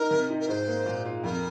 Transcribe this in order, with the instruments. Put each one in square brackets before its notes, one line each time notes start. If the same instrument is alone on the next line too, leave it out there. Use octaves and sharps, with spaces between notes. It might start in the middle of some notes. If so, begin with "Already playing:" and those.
Already playing: [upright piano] D#4 [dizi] A#4
[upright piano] C3
D#4
[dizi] A#4
[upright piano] G#2 [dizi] C5
[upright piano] A#3
A#2
F4
[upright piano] F2 [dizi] A#4